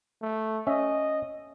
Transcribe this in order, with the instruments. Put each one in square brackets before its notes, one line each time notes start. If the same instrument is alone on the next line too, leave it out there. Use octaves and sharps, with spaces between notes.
[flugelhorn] A3
[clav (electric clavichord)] C#4 E5 [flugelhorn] D#5